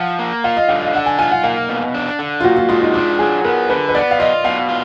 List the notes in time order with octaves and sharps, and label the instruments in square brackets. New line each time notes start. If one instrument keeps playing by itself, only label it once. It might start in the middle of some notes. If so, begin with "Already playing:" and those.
Already playing: [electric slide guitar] F3 [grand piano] F#5
[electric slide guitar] A#3
[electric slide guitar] F4 [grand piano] F5
[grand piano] D#5
[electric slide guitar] D3 [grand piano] F5
[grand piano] D#5
[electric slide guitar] D4 [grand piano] F#5
[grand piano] G#5
[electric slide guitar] F4 [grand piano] G#5
[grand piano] F#5
[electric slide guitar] A#3 [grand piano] F5
[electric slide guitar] B2
D4
D3
[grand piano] F4
[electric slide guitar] A#2 [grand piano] F#4
[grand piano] F4
[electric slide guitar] G#3 [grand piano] F4
[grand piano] D#4
[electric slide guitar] D4 [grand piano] F4
[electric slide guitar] F#3 [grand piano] G#4
[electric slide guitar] B3 [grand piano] A#4
[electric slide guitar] D3 [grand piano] B4
[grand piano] B4
[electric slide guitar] B3 [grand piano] D5
[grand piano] F5
[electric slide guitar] F4 [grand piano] D#5
[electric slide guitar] B2 [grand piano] F5
[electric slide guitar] F4